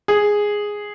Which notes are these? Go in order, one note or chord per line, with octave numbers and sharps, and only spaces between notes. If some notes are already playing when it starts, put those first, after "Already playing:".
G#4